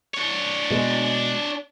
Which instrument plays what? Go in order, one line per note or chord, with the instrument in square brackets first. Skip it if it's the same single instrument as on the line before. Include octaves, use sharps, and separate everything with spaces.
[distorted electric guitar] D4 C#5
[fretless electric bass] B2 G#3